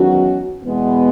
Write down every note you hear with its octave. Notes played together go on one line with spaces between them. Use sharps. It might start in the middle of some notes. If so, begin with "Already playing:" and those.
Already playing: E2 D#3 F#3 C#4 F#4
E2 B2 G#3 B3